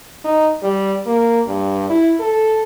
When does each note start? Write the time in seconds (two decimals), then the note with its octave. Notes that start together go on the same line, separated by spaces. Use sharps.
0.25 D#4
0.63 G3
1.06 A#3
1.47 G2
1.90 E4
2.20 A4